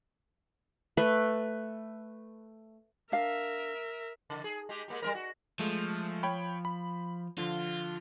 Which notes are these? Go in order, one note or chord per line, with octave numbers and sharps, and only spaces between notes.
A3 B4
D4 A#4 E5 F5
C#3
G#4
G#3 G4
G#3 A#3 G4
G3 B3 A#4
F#4
F3 G#3 A3
C#5 G5 B5
B5
D3 F3 F4